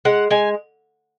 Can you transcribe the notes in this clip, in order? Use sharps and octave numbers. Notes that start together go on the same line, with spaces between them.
G#3 F#5
G#3 G#5